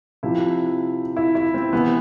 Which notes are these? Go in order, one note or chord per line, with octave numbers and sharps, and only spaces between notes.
C3 F3 E4
E4
E4
C4
C3 E3 B3